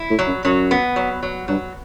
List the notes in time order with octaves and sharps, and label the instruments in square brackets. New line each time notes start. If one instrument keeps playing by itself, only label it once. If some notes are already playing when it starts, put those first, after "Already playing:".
Already playing: [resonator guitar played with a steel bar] E4
[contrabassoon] A2
[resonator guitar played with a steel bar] F#3
[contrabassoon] F#2
[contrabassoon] F#2 [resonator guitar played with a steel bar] F#3
[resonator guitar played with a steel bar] B3
F#3
F#3
[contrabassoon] G2 [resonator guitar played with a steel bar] F#3